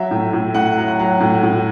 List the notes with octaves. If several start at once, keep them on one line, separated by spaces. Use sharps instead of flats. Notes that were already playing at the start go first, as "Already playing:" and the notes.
Already playing: F#3 E5
A2
A2
A2 F#5
F#3
F#5
F#3
A2
A2